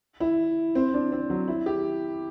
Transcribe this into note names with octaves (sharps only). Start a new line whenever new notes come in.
E4
C4
D4
C4
F#3
E4
G4